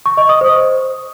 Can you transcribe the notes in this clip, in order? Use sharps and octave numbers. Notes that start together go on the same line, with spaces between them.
C#6
D#5
D#6
C5